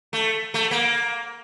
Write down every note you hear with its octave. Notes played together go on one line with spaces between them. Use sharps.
A3
A3
A#3